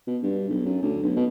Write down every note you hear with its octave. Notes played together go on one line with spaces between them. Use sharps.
B2
G2
B1
F#2
D2
B1
B2